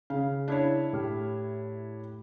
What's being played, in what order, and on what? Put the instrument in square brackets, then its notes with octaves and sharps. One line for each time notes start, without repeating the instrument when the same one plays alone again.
[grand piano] C#3 [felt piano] F5
[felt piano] D4 E4 C#5
[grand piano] A2 G4 F6